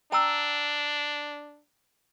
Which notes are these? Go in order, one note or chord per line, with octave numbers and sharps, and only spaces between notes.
D4 G5 A#5 E6